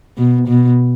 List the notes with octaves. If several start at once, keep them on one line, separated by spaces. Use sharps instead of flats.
B2
B2